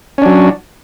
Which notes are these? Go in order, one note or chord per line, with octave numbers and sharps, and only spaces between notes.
F#3 C#4 D4